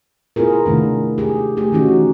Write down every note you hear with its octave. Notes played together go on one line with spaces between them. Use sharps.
B3 E4 F4 G#4 A#4
C3 D#3 A3 D4
G4 G#4
A3 G4 G#4
D#3 E3 C#4 D#4 F#4